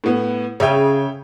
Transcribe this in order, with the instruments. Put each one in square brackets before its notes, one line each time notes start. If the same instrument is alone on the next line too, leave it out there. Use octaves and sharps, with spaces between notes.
[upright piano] A2 B3
[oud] C#3 [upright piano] C#5 E5 G5